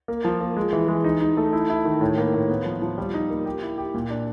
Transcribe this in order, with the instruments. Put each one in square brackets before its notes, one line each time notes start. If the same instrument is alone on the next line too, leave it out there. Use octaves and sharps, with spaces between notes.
[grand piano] A#3
F3
A#3
G#3
E3
G#3
D#4
D#4
A3
E4
E4
D#3
A2
A#3
A2
B3
F3
F3
G3
D#4
A#3
G4
E4
G4
A#2
D4